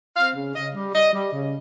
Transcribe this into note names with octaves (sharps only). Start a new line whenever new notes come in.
C4 F5
C#3
C#3 D#5
G3
G3 D#5
G3
C#3